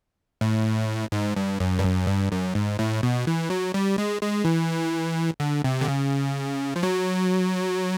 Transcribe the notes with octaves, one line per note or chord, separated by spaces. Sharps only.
A2
G#2
G2
F#2
G2
F#2
G2
F#2
G#2
A2
B2
E3
F#3
G3
G#3
G#3
E3
D3
C3
D3
C#3
F3
F#3